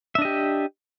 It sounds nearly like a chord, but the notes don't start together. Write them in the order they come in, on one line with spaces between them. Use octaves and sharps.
E5 D4 D#5 G4